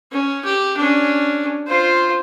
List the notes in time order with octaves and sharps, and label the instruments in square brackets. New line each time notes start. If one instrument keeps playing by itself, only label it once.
[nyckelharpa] C#4
G4
C#4 D4
F4 C5